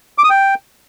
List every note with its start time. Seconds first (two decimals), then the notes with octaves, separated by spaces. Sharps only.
0.18 D6
0.24 D#6
0.30 G5